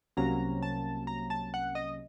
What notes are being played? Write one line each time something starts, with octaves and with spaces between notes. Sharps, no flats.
C2 C3 F#3 A#3 C#4 A#5
A5
A#5
A5
F#5
D#5